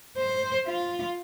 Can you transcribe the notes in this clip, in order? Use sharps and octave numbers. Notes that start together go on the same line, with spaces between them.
C5
F4